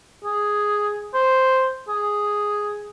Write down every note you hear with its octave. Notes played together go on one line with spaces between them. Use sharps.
G#4
C5
G#4